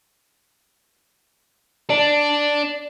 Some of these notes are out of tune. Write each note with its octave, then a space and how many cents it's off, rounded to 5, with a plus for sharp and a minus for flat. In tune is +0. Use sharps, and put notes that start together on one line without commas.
D4 +0 D5 +0